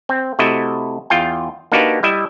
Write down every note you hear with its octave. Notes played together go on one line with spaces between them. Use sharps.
C4
C3 A3 E4 F#4 D#5
E2 F4 G5
A#3 D4 D#4 F#4 G4 B4
G3 E4 D#5 E5